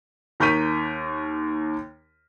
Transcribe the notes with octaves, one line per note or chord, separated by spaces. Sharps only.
D#2 A#4 C#6 G6 B6 D#7